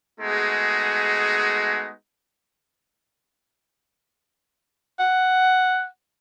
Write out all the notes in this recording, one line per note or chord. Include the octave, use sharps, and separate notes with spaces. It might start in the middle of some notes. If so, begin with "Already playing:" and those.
G#3 A3 B3 D#4 F#4 G#4
F#5